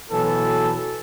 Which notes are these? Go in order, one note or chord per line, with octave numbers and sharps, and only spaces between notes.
B2 E3 F#3 A4